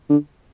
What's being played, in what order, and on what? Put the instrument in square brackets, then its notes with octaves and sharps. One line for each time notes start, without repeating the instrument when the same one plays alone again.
[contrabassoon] D3